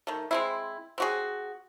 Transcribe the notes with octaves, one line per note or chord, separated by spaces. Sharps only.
D#3 A3
G#3 C4 E4
C4 F#4 G#4